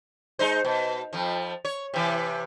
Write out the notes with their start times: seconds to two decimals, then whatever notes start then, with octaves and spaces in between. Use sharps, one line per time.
0.39 G#3 D#4 C5
0.65 B2
1.13 F2 F3
1.65 C#5
1.94 C3 E3